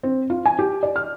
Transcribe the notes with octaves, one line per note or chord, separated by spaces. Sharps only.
C4
F4
G#5
G4
D5
F6